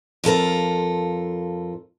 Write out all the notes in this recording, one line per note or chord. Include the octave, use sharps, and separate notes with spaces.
F2 F4 A4 A#4